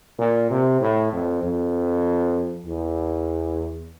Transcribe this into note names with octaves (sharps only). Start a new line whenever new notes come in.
A#2
C3
A2
F2
F2
E2